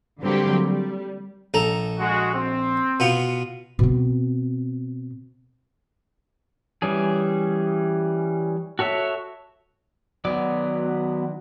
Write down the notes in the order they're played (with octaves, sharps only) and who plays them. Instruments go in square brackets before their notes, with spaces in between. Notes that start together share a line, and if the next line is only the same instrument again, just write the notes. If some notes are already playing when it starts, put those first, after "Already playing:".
[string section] D3 F#3 G3 A#3 C4 G4
G3
[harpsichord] A#1 A4 A#5
[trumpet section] G#3 F#4
C4
[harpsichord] B2 B3 F4
[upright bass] B2 C4
[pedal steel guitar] E3 G3 C#4 G#4
F#4 A4 C#5 E5
[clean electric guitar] D#3 F#4 D5 [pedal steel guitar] F#3 B3